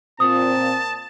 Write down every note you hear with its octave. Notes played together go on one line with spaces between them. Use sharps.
A#2 C4 A5 D#6